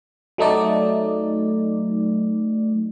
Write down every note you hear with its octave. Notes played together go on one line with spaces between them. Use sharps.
F#3 A3 D#4 D5